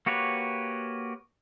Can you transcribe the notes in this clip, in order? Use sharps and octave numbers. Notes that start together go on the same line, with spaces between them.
A#3 F#4 G4 B4 C#5